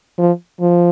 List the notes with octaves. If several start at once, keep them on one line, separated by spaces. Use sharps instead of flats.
F3
F3